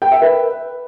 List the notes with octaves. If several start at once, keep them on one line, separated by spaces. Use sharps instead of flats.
G5
E5
B4